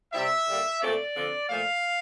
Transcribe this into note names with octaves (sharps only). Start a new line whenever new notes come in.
C3 G3 C4 E5
D3 G3 A#3
A#2 A3 C4 D5
D3 F3 C4
A#2 F3 A3 F5